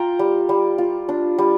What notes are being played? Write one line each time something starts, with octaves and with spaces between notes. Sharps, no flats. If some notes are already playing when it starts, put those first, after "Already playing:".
Already playing: F4 G5 A#5
G3
G3
F4
D4
G3